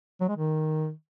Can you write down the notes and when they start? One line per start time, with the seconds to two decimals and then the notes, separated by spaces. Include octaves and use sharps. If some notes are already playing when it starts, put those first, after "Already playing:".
0.21 F#3
0.28 G#3
0.36 D#3